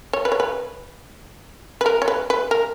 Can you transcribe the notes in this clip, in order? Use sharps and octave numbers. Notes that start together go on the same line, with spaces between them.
C#5
B4
C#5
B4
B4
A#4
C#5
B4
B4
A#4